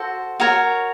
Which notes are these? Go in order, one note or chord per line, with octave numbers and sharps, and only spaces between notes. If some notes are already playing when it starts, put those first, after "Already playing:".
Already playing: F#4 A4 C5
F#4 A#4 C#5